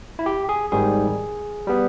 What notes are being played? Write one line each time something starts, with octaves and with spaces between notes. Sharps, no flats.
E4
G4
G#4
G#1 G#2 D#3 G3 G#4
G3 B3